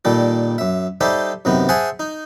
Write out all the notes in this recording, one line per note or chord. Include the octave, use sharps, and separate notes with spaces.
A#2 D#3 G3 A4
F#2 E5
G3 D#4 G4 A4 C5 E5
F#2 C3 D#3 B3
G#4 C5 E5 F#5 G#5 A5
D#4